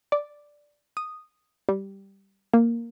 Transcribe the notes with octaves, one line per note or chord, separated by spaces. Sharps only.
D5
D#6
G3
A#3